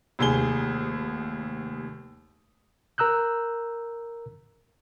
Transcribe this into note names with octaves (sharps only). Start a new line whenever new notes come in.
F1 D#2 G#4 G7
A#4 A#5 E6 F#6 G6